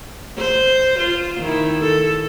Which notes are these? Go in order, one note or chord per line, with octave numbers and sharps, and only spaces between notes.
C5
F4
D#3 E4
A4